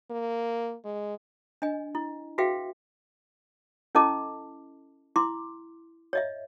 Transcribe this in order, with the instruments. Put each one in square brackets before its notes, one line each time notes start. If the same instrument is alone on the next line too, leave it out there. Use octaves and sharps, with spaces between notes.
[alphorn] A#3
G#3
[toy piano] D4 D#5 G#5
E4
F#4 G#4 B4 E5 F5 G5
C#4 E4 A4 D#5 A5 D6
E4 C6 D6
C#5 D#5 E5